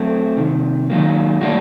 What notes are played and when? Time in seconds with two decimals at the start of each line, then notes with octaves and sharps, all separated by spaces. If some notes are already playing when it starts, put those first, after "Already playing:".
Already playing: F#3 A3 C4
0.37 C2 C3 D#3
0.90 D#3 F#3 A#3
1.41 A2 G3 A#3 D4 F#4